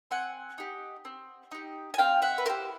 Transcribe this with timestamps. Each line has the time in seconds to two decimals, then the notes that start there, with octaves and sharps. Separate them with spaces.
0.11 C4 F#5 G#5
0.58 D#4 G4
1.05 C4
1.51 D#4 G4
1.94 G#5
1.98 C4 F5 G5
2.22 E5 F#5
2.38 B4
2.45 E4 G4 A#4 C5